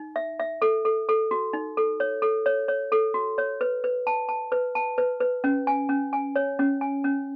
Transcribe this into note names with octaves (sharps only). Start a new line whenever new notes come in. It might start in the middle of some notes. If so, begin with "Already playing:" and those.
Already playing: D#4
E5
E5
A4
A4
A4
F#4
D#4
A4
C#5
A4
C#5
C#5
A4
F#4
C#5
B4
B4
A5
A5
B4
A5
B4
B4
C#4
G#5
C#4
G#5
C#5
C#4
G#5
C#4